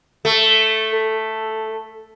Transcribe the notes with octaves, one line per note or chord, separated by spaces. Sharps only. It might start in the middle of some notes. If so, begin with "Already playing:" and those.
A3
A4